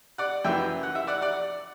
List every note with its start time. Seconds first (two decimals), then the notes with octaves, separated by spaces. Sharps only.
0.18 D5 F#5
0.44 F#2 E3 E5 G5
0.83 F#5
0.95 E5
1.07 D5 F#5
1.22 D5 F#5